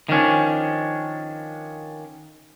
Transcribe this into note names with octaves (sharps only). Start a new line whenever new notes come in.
D#3 F3 C#4 D4